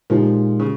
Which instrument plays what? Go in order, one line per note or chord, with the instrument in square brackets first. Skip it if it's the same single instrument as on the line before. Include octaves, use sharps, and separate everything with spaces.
[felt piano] A#2 G#3 D#4 G4 [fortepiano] F3
[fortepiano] C#3